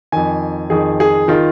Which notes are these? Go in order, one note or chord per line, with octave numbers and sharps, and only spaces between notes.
F2 D#3 G#5
F2 D#3 G#4
G#4
D#3 F4